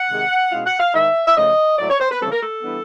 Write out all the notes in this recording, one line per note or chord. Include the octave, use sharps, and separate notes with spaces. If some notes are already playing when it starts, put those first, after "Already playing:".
Already playing: F#5
C3 D#3 G#3
B2 G#3 C#4 E4 F5
F#5
F5
G#2 D#3 G#3 E5
E5
C#3 F3 A3 D#5
A2 F#3 A3 D5
C#5
C5
B4
C#3 E3 G3 C4 A4
A#4
A4
E3 G3 B3 D4